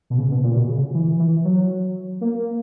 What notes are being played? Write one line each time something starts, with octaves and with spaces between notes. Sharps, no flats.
B2
C#3
B2
A#2
B2
C#3
E3
E3
F#3
A#3